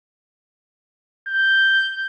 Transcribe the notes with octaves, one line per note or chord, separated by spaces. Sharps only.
G6